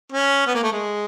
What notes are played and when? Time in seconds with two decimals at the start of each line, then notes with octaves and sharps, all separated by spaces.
0.12 C#4
0.47 B3
0.55 A#3
0.63 A3
0.72 G#3